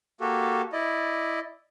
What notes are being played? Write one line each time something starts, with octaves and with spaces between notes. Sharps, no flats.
A#3 F#4 G4 A4
E4 D5 D#5